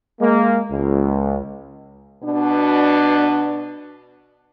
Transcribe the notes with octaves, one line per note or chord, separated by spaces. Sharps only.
G#3 A#3
C#2
B2 D4